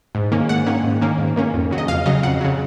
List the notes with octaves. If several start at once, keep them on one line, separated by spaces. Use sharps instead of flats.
G#2
D#3 A#3 C#4
G#2 F#5
D#3 A#3 C#4
G#2
D#3 A#3 C#4
G#2
D#3 A#3 C#4
F2
C#3 F#3
D#5
F2 F5
C#3 F#3 D#5
F2 F#5
C#3 F#3